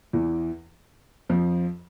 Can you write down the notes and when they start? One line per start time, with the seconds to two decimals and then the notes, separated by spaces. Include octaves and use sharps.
0.13 E2 E3
1.29 F2 F3